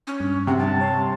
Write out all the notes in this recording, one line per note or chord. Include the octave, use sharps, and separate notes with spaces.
C#4
G2
C3 F#5
G2 A5
C#5 C6